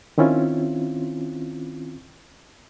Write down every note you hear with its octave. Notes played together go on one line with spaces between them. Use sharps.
D#3 C4 C#4 E4 F4